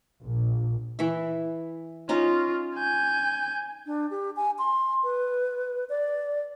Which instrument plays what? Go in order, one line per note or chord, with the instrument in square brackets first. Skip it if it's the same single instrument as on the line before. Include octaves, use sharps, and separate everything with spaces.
[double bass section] A#1
[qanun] E3 E5
[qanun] C#4 D#4 D#5 [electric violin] F4
[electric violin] G#5 G6
[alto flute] D4
G4
G#5
C6
B4
D5